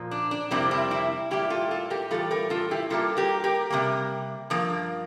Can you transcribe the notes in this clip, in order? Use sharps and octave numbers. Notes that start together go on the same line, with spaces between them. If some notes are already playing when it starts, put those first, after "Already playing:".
Already playing: A#2 F3 A#3
D4
D4
F2 C3 G3 A#3 C4 E4
C4 E4
C4 E4
A2 G3 A#3 E4 G4
F4 A4
F4 A4
G4 A#4
A2 E3 G3 F4 A4
G4 A#4
F4 A4
E4 G4
A2 G3 A#3 F4 A4
G4 A#4
G4 A#4
C3 G3 A#3
G2 F3 A#3